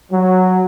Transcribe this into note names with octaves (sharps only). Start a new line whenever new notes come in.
F#3